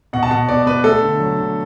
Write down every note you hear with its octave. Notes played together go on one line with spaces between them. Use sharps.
B2 F#5
A5
B2 F#5
B3 D5
B3 B4
A3 A4
D3
F#3
D3